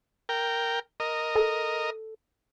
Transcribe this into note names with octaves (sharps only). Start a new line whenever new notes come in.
A#4 G5
A#4 D#5
A4